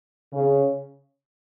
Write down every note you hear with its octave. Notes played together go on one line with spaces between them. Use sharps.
C#3